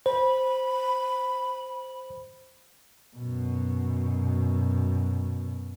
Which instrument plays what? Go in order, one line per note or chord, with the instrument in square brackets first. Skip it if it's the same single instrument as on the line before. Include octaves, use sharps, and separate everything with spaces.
[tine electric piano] C5 [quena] B5
[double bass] F#2 B2